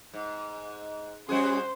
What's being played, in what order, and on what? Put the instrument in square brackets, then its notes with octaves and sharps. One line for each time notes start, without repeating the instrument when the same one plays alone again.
[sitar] G#2
[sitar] G3 F#4 G#4 [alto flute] C#4 [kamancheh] C5